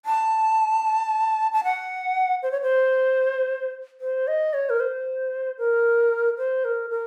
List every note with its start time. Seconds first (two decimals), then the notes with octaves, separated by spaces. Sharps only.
0.06 A5
1.53 A5
1.64 F#5
2.43 C5
2.52 C#5
2.62 C5
4.01 C5
4.27 D#5
4.54 C#5
4.70 A#4
4.80 C5
5.58 A#4
6.38 C5
6.65 A#4
6.90 A#4